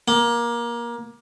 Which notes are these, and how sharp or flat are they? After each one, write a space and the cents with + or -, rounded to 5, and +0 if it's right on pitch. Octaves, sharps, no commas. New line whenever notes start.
A#3 +20